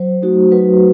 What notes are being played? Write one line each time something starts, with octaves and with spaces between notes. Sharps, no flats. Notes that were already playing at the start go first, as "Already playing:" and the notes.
Already playing: F#3 C5
A3 D#4 F#4
F#3 B4